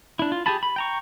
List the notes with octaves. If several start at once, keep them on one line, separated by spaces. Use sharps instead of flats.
D4 E4
F4
G4 G#4 G#5 A5 B5
B5
G5 A#5 C#6